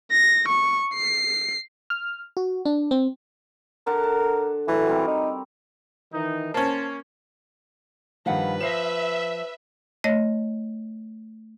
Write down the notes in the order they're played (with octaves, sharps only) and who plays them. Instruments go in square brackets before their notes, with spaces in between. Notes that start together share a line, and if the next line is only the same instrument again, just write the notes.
[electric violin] A#6
C#6
C7
[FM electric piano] F6
F#4
D4
C4
[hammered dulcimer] D3 F#5 A5 [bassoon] A#4
[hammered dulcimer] A5
[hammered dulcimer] D3 F#3 A3 [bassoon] E3
[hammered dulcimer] G3 C4 A#4
[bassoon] D#4
[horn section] D#3 E3 D#4
[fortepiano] A#3 C#4 [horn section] C5 A5
[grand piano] G2 D#3 F3 [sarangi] B4 [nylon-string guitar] F5 F#5
[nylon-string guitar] F3 [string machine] E5 [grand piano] A#6 C7 E7
[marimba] A3 C#5 D#5 A#6